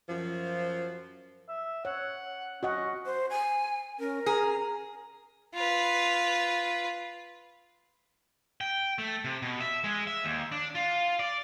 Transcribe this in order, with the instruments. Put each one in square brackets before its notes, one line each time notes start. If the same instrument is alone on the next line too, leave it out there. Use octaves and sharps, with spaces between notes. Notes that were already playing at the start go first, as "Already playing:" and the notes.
[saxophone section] F#2 F3
[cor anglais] E5
[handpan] C#5 [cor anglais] F#5
[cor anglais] C#4 [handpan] F#4 D#5 F#5
[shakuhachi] C5
G#5
[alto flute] C#4 [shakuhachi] A#4
[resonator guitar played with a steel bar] G#4 [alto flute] A#5
[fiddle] F4 B4
[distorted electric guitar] G5
A3
C3
B2
E5
G#3
E5
D#2
D4
F4
D5